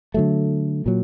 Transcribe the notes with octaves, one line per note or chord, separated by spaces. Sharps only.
D3 F#3 A3
A#2 F#3